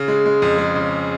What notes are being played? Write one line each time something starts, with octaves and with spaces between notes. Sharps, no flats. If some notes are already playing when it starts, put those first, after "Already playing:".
Already playing: C#3
G#3
G#3
F2
G#3
C#3